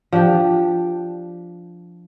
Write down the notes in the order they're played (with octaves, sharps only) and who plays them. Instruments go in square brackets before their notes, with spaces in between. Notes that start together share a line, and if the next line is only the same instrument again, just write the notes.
[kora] F3 D4 G4